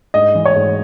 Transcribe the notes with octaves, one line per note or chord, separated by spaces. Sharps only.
G#2 D#5
E3
C#5
G#2